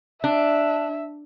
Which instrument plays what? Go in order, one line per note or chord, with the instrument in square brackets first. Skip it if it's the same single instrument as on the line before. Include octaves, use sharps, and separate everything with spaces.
[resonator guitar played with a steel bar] D4 [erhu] E5